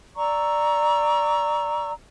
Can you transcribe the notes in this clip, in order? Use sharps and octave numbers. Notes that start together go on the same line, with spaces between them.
D5 A#5 C#6 E6